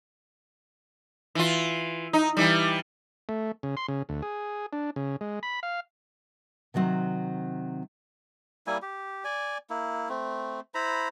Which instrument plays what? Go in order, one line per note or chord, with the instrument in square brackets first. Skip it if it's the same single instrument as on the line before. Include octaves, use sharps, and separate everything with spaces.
[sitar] E3 F4
D#4
E3 G3
[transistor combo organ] A3
C#3
C6
C#3
D2
G#4
D4
C#3
G#3
B5
F5
[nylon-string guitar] C3 D#3 F#3 C4
[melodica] G3 A#3 E4 G#5
G4
D5 G#5
A#3 E4
A3 C4
E4 C5 A#5 B5